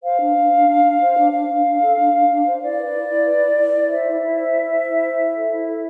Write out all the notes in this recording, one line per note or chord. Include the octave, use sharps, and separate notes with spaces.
C5 F5
D4
D4
D4
D4
D4
C5
D4
D4 F5
D4
D4
A4
D4
D4
D4
C5
E4 D5
B4
E4
E4
B4
E4
E4
E4
C5 E5
E4
E4
C5
E4
C5
E4
C5
E4
A4
E4
A4